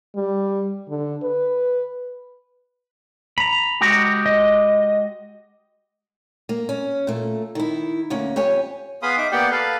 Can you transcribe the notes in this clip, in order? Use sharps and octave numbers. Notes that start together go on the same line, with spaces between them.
G3
D3
B4
A#5 B5
G#3 F#4 G4
D#5
A#3
C#4
A#2 A3
D#3 E4
D2 A#3 C#4 F#5
F2 G4 C#5 G#5
B3 G#4 F5 B5 C6 D#6
D#4 E5 D6
A#3 B3 G4 D5 F#5 G5
A4 B4 F5